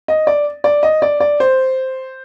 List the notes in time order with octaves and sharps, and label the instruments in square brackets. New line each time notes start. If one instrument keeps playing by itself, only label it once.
[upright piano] D#5
D5
D5
D#5
D5
D5
C5